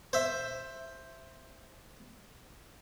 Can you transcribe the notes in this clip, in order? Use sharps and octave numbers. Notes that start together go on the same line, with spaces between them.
C5 E5